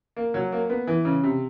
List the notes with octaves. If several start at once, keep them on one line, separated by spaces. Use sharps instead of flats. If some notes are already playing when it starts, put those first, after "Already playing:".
A#3
F#3
A#3
B3
E3
C#3
C3